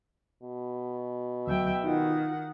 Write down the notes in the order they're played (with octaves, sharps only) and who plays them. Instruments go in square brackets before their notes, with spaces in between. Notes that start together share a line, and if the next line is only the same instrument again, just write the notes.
[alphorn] B2
[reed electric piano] D2 F#3 [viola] E5 G5
[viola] D#3 F#5 [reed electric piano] D#4 F4